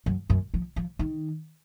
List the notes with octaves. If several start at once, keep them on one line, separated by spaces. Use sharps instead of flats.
F#2
F#2
F3
F3
D#3